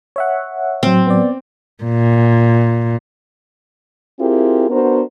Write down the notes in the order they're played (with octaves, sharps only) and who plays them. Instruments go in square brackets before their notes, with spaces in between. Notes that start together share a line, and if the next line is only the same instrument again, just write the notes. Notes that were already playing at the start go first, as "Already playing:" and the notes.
[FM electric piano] C#5 E5 F#5
[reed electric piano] A2 F#3 [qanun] C4
[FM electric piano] B3 D5
[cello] A#2
[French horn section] C4 E4 F4 G4 G#4 A#4
B3 D4 F#4 A#4 C5